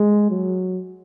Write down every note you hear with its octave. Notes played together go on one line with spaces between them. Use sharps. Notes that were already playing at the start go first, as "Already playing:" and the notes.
Already playing: G#3
F#3